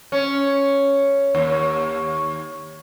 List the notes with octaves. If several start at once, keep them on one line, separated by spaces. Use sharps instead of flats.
C#4
D#2